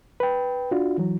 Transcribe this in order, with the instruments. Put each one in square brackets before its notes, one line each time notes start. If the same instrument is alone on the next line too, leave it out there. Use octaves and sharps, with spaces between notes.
[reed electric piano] B4 G5
D4 F4 F#4
E3 F#3